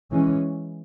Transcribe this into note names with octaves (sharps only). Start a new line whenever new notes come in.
E3 G#3 C#4